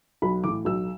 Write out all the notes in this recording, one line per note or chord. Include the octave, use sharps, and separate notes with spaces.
B1 B5
A2 E3 D6
B1 E6